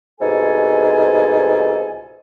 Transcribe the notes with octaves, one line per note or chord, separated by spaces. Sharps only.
C2 G#2 B2 F3 A4 G#5